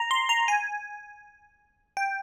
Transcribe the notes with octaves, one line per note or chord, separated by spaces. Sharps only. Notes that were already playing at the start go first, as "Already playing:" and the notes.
Already playing: A#5
C6
A#5
G#5
G5